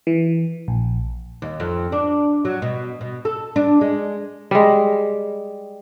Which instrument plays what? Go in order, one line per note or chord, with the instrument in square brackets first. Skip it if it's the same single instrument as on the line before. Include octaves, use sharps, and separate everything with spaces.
[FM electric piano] E3
A#1
[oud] D#2
F2
D4
F#3
B2
B2
A4
D4
G#3
[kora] G3 G#3